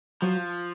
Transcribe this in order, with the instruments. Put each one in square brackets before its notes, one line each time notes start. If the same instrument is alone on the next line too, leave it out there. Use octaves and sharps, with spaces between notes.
[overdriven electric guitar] F3 [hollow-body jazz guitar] F#3